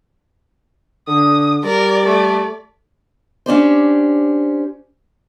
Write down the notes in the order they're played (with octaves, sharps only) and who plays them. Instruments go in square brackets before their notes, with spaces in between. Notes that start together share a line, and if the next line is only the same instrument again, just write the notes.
[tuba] D3 [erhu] D#6
[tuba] G3 [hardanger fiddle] A#4 [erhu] D5
[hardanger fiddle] A3
[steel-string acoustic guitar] C#4 D4 G4 C5